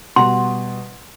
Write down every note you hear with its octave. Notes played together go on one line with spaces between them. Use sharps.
B2 G3 F#5 A#5 C6